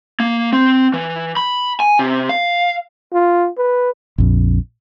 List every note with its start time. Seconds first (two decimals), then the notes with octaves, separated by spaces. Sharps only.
0.20 A#3
0.53 C4
0.93 E3
1.37 B5
1.80 G#5
1.99 C3
2.29 F5
3.13 F4
3.58 B4
4.18 A#1 F2